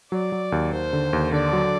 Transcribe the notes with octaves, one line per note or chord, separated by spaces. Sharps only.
F#3 D5
F#3
D#2
D#2 C5
D3
D#2
D3 D5
F#3